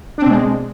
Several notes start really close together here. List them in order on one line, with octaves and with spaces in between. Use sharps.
D4 C4 B2 G#3